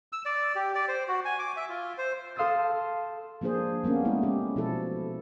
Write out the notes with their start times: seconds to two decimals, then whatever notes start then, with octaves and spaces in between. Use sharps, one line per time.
0.13 E6
0.25 D5
0.55 G4
0.75 D5
0.88 C5
1.08 F#4
1.25 G#5
1.39 D6
1.57 E5
1.69 F4
1.98 C5
2.36 A4 F5 C6 D#6 E6 A6
3.41 F3 A#3 D4 G#4 C5
3.84 G3 A#3 B3 C#4
4.05 G#3 A3 E4
4.23 C#4 G4
4.56 B2 F3 E4 A4